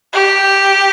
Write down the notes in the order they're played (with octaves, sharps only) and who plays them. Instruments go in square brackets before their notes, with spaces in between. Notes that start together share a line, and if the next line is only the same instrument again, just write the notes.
[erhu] G4